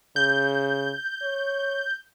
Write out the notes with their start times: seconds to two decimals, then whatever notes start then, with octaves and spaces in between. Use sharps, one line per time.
0.16 C#3 G6
1.22 C#5